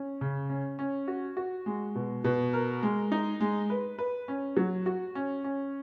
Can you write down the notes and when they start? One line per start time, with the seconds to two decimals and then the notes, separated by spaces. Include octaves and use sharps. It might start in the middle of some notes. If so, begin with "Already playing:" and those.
Already playing: C#4
0.21 C#3
0.49 C#4
0.79 C#4
1.08 F#4
1.37 F#4
1.66 G#3
1.95 B2
2.24 B2
2.53 A#4
2.83 G#3
3.12 D#4
3.40 G#3
3.70 B4
3.99 B4
4.28 C#4
4.57 F#3
4.86 F#4
5.15 C#4
5.44 C#4